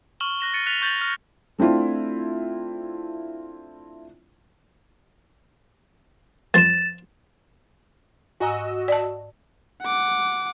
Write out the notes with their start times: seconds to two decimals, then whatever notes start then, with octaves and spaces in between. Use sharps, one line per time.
0.20 C#6 F6 E7 F#7 G7
0.41 F#6 A#6 E7
0.54 A6 C#7 D#7
0.66 F#6 A6 B6 F7 G7
0.82 C#6 G6 A6 F7 F#7
1.01 F6 A#6
1.58 A3 C4 D4 E4 F4
6.54 F2 F3 C5 A6 E7
8.40 G#2 F#4 D#5 G#5 A#5 E6
8.88 D5 A5
9.82 F#5 D6